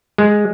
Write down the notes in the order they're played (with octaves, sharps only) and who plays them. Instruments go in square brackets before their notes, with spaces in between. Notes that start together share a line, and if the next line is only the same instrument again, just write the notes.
[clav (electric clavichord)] G#3